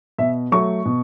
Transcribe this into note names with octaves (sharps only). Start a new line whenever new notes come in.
B2 E5
F#3 A3 C#6
B2